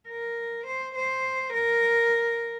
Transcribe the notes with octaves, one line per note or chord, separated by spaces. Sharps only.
A#4
C5
C5
A#4